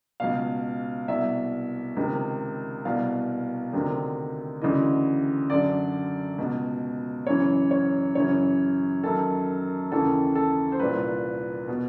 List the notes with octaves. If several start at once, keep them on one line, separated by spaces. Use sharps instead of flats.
C#2 B2 F5
C2 B2 E5
C#2 C3 D#3
C2 B2 F5
D2 C3 D#3
D2 C#3 E3 D#5
F#2 D3 D5
C#2 B2
F#2 C#3 E3 C#5
C#5
F#2 C#3 E3 C#5
F#2 D#3 A4
D#2 C#3 E3 A4
A4
C5
C2 A#2 B4
B2